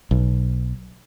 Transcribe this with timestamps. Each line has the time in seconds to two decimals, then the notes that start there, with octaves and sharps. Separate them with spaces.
0.11 B1